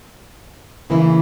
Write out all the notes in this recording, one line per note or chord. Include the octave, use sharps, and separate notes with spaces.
C#3 E3 A#3 E4